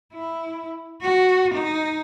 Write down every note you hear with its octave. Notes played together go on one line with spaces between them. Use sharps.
E4
F#4
D#4